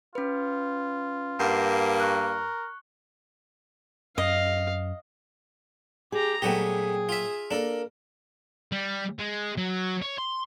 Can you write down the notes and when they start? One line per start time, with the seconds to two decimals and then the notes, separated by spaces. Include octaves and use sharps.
0.15 C#4 F4 B4
1.40 G2 A#3 F#5 G6 C7
2.00 A#4 C#6 F6 F#6
4.18 F#2 D#5 F5
6.12 G4 G#4 A#5
6.42 A#2 F#3 A3 B3 G4 G#4 G5
7.09 F4 E5
7.51 A#3 D4 A4 A#4
8.72 G3
9.19 G#3
9.58 F#3
10.02 C#5
10.18 C6